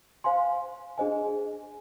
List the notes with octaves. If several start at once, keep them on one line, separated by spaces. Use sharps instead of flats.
C5 F5 G#5 C6
D4 G#4 C5 D#5 G#5